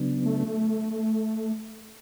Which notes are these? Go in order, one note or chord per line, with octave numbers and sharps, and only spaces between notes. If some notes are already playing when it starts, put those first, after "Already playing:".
Already playing: C#3 F#3 B3 D4
A3